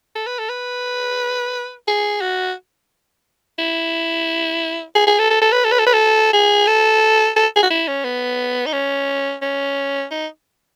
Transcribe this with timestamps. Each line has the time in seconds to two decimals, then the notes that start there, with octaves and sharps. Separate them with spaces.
0.16 A4
0.27 B4
0.39 A4
0.49 B4
1.88 G#4
2.21 F#4
3.59 E4
4.95 G#4
5.07 G#4
5.19 A4
5.30 A4
5.42 A4
5.52 B4
5.65 A4
5.72 B4
5.79 A4
5.86 B4
5.93 A4
6.33 G#4
6.67 A4
7.36 A4
7.56 G#4
7.63 F#4
7.70 E4
7.88 C#4
8.04 B3
8.66 D#4
8.73 C#4
9.42 C#4
10.11 D#4